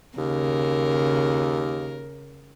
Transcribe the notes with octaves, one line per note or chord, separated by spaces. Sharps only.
D#2 C#3 A#4